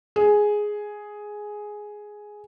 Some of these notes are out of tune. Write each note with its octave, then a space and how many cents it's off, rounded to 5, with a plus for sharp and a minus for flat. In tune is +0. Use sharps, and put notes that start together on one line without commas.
G#4 +5